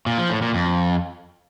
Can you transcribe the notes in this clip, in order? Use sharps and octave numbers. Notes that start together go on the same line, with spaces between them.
A#2
F3
A2
A#2
F2